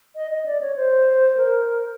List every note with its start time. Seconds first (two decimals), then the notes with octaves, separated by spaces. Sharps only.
0.15 D#5
0.31 D#5
0.46 D5
0.61 C#5
0.76 C5
1.37 A#4